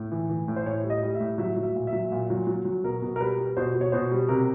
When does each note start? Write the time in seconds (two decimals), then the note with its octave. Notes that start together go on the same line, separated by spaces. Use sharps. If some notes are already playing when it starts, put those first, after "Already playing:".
Already playing: A2
0.12 E3
0.29 E3
0.48 A2
0.56 C5
0.66 A2 C#5
0.84 G3
0.90 D#5
1.03 G3
1.15 E5
1.20 A2
1.38 F#3 E5
1.56 F#3
1.63 E5
1.76 A#2
1.87 E5
1.93 F#3
2.12 A#2
2.30 F#3
2.47 F#3
2.65 F#3
2.84 B2 A#4
3.02 B2
3.16 A#4
3.20 G3 B4
3.38 G3
3.57 B2 C5
3.74 B2
3.81 C#5
3.92 B2 C5
4.11 G3
4.29 C3 A#4